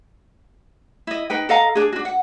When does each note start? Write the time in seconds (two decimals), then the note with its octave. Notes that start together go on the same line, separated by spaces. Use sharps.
1.07 E4 D#5
1.30 D#4 B4 G5
1.49 A4 D#5 F5 A#5
1.75 D4 G#4
1.93 D4 F#4
2.05 F#5